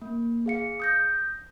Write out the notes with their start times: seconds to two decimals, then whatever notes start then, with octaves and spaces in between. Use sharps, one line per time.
0.02 A#3
0.46 G#4 F5 C#7
0.80 D#6 G6 A#6